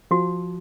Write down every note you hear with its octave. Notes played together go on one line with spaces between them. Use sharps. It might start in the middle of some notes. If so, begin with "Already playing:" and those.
F3 F#4